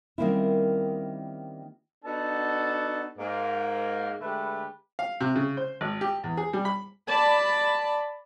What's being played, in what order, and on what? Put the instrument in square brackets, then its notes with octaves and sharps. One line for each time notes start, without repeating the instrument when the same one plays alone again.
[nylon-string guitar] D#3 G3 A#3 C4 C#4 E4
[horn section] B3 D4 D#4 F#4 A4 A5
G#2 A#3
D3 G#3 A3 G4 B4
[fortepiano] F5
C3
C#3
C5
G#1
G4
E2
G#4
G3
B5
[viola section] D5 A5 B5